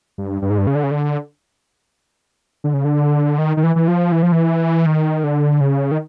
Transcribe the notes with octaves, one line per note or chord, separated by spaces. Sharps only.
G2
G2
G#2
G2
C#3
D3
C#3
D3
D3
C#3
D3
D#3
D#3
E3
E3
F3
E3
F3
E3
D#3
D3
C#3
D#3